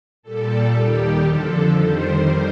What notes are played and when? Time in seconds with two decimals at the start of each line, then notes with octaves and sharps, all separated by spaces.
0.23 A#2 G3 A4
0.73 D#2 D#3 G3 G4
1.22 F2 D3 F3 A4
1.72 F2 D#3 G3 C5